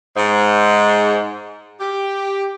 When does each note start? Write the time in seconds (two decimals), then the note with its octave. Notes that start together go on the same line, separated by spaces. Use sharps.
0.17 G#2
1.79 G4